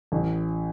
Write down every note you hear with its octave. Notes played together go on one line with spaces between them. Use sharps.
A1